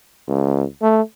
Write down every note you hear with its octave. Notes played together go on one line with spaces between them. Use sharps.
C#2
A3